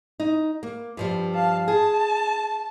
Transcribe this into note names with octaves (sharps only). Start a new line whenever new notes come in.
D#4
A#3
G2 F3 G3
F5 A5
G#4 A5